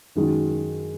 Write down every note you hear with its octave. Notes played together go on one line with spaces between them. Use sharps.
F#2 D#3 G#3 D#4 F#4